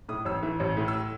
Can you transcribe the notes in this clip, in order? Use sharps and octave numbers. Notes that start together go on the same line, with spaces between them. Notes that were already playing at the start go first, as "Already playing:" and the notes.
A2 D#6
A1 E6
E3
A1
A2
E6